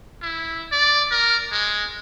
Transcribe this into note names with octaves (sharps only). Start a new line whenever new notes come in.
E4
D5
A#4
G#3